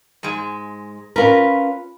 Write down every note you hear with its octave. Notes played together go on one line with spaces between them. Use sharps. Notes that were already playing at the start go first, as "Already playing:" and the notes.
G#2 G#3
C#4 F4 A#4 B4